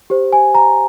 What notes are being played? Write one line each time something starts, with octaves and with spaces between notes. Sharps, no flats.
G4 C5
G#5
A#5